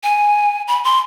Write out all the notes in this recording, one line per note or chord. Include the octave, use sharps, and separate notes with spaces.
G#5
B5
C6